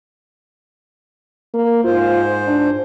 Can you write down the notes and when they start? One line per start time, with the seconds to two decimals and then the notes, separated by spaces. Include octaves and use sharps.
1.54 A#3
1.84 G#2 F4 C5
2.47 D4